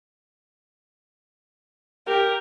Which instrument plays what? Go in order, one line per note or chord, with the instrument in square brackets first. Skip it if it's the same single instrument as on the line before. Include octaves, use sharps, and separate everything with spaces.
[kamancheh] G4 [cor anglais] A#4